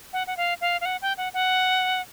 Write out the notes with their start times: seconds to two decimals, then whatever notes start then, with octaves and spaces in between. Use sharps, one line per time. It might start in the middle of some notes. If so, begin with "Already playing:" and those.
0.13 F#5
0.27 F#5
0.37 F5
0.61 F5
0.81 F5
0.85 F#5
1.02 G5
1.17 F#5
1.34 F#5